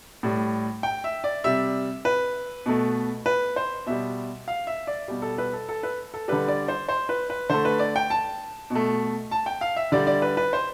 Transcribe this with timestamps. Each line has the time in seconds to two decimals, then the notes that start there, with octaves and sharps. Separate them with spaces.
0.23 A2 G3
0.83 G5
1.04 E5
1.24 D5
1.44 C3 G3 E5
2.05 B4
2.66 B2 A3
3.26 B4
3.56 C5
3.86 B2 G3 E5
4.48 F5
4.67 E5
4.87 D5
5.08 B2 G3
5.22 A4
5.38 B4
5.53 A4
5.69 A4
5.83 B4
6.14 A4
6.28 D3 G3 B4
6.48 D5
6.68 C5
6.89 C5
7.09 B4
7.30 B4
7.49 D3 A3 C5
7.65 B4
7.79 D5
7.96 G5
8.10 A5
8.70 B2
8.75 A3
9.31 A5
9.46 G5
9.61 F5
9.76 E5
9.92 D3 G3 D5
10.07 D5
10.22 B4
10.37 B4
10.53 C5